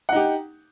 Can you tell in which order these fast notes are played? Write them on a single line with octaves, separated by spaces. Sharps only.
F#5 D#4 G4